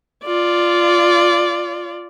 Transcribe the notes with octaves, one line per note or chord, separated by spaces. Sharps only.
F4 D5